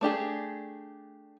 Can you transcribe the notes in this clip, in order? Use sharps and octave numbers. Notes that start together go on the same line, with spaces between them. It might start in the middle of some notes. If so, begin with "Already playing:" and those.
A3 D4 G4 G#4